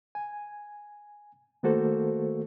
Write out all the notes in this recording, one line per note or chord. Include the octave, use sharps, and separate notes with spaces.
G#5
D#3 A3 A#3 F#4 A4 C5